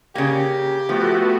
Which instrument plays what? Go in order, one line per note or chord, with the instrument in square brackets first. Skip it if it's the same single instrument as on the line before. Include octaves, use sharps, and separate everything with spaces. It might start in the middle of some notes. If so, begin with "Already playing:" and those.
[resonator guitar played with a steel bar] C#3 A#3 [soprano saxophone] G4
[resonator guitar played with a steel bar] F3 [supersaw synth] A3 B3 F#4